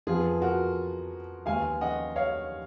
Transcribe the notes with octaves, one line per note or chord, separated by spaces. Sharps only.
F2 F3 B3 F4 G#4
F#4 A#4
D#2 D#3 G#3 B3 F5 G#5
D#5 F#5
C#5 F5